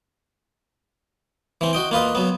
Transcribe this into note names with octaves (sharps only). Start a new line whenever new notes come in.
E3 C4
F#4 D#5 G5
A#3 F4 B4 D#5
F#3 B3